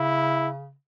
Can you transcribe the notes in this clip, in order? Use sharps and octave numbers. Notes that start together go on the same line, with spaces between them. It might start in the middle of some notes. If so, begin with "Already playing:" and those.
Already playing: C#3 E4